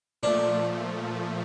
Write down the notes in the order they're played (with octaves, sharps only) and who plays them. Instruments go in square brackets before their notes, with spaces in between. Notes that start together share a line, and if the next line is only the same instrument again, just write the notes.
[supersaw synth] A#2 F3 A3 [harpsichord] D4